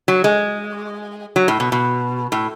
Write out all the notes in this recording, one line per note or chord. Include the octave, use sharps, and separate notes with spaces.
F#3
G#3
F#3
A2
B2
B2
A2